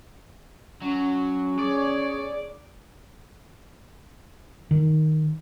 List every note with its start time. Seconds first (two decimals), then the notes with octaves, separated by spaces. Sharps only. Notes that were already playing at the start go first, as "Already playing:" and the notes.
0.82 F#3 C#4
1.59 G#4 C#5 D5
4.71 D#3